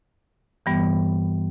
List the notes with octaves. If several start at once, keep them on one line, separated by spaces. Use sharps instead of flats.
G2 E3 G3 B3